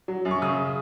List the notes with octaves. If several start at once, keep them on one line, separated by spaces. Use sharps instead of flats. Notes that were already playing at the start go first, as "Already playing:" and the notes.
F#3
F#2
C#6
C#3 D#6